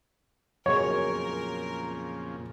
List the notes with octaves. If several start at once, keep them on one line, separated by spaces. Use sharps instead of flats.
F2 A#2 C#3 F#3 B3 G#4 A#4 C#5